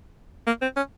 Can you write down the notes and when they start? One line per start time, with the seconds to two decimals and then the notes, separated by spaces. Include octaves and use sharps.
0.47 A#3
0.62 C4
0.76 C#4